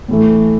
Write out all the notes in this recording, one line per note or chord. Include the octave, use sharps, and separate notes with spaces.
A2 E3 A3